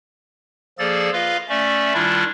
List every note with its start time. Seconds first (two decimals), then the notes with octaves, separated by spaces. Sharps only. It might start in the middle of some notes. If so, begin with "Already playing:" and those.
0.79 F3 A#3 G#4 A4 D5 A6
1.13 F4 B4 D#5 F5
1.49 A3 C#4 D5 E5
1.94 D#3 G3 D4 E4 F4